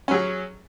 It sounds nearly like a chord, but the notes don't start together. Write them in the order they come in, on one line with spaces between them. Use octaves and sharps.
C#4 F#3 G#4